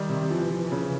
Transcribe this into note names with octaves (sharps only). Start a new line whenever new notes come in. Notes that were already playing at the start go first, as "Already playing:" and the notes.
Already playing: D#3 G3
C3
E3 F3
F3
E3
C#3